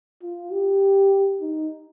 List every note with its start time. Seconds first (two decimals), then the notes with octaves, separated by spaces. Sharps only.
0.22 F4
0.52 G4
1.41 D#4